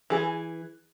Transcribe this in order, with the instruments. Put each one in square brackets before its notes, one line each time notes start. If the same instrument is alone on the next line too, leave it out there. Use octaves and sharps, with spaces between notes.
[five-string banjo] E3 G#4